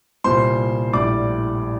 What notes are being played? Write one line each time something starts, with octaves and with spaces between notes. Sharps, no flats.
C2 A#2 G3 C5 C6
A#1 A2 G3 D5 D6